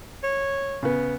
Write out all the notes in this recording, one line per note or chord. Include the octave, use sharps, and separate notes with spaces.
C#5
C#3 B3